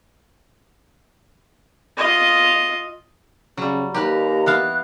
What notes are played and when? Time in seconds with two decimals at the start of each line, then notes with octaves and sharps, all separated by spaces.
1.97 F4 D#5
3.57 C#3 F#3 G3
3.94 D#2 G4 B4 A#5
4.46 E3 B3 F5 F#6